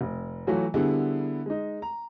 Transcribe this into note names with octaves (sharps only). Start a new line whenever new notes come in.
F1
E3 F#3 A3 F4 F#4
D3 G3 B3 E4 G#4
G#3 D#4
A#5